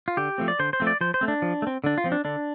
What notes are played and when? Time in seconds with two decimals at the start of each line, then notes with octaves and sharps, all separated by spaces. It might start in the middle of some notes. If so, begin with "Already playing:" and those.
0.08 F4
0.17 D3 G4
0.38 F3 A3 C4
0.48 D5
0.59 D3 C5
0.73 C5
0.80 F3 A3 C4
0.87 D5
1.01 F3 C5
1.14 C5
1.21 A3 C4
1.28 D4
1.42 F3
1.62 A3
1.67 C4
1.84 D3 D4
1.98 F4
2.04 F3 C4
2.12 D4
2.25 D3 D4